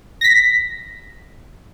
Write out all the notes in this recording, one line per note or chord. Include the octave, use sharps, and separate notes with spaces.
A#6 B6